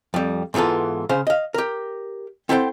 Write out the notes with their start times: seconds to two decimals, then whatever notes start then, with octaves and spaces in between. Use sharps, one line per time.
0.14 F2 G3
0.54 G#2 E3 B3 F4 A4
1.09 C#3 C5 F5
1.27 D#5 F5
1.54 G4 A#4
2.49 C4 E4 A4 C5 F#5 G5